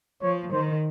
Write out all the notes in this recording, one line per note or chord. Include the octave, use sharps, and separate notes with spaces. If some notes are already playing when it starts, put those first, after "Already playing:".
F3 C#5
D#3 C5